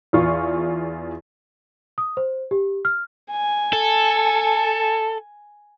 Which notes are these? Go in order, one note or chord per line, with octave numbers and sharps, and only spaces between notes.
E2 F4 C#6
D#6
C5
G4
F6
G#5
A4